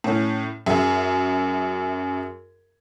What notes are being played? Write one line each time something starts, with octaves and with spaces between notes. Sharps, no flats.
A2 C#4
F#2 G#4 E5